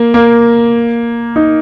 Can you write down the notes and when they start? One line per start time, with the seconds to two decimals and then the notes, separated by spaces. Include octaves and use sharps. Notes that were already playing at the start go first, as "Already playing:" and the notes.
Already playing: A#3
0.14 A#3
1.36 D#4